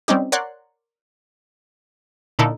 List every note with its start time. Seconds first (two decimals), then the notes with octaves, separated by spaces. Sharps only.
0.08 G3 C4 C#4 D#4 G4
0.32 A#4 C#5 D5 F#5 C6 F#6
2.39 A#2 D3 D#4 E4 A4 A#4